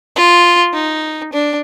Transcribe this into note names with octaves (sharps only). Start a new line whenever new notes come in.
F4
D#4
D4